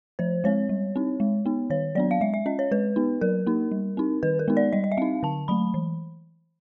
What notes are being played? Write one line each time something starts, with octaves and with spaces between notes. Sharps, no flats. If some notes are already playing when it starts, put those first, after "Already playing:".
F3 C5
G#3 C4 C#5
G3
C4 D#4
G#3
B3 D#4
D#3 C#5
F#3 B3 D4 D5
F5
G#3 E5
E5
C#4 D#5
C#5
G#3 B4
B3 D#4
F#3 A#4
A#3 D#4
G3
C4 D#4
D#3 B4
A#4
G#3 B3 D#4
D5
G3 D#5
D#5
E5
C4 D#4 F5
D3 A5
F#3 A3 B5
E3